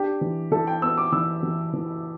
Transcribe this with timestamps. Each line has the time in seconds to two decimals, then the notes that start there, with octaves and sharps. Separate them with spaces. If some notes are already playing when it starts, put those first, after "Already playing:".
Already playing: D4 G4
0.21 E3
0.51 E3 A4
0.67 G5
0.82 B3 E6
0.97 D6
1.12 E3 E6
1.43 E3
1.73 E3